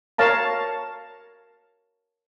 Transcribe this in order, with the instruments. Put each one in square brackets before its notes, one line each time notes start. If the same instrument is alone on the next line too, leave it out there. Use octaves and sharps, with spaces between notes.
[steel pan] A#4 C#5 F5 A5 A#5